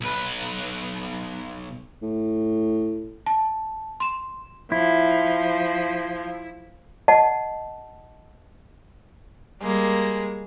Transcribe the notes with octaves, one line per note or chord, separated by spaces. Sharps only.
B1 B4
A2
A5
C6 E7
F3 E4
D#5 F#5 A5
G3 G#3 A#3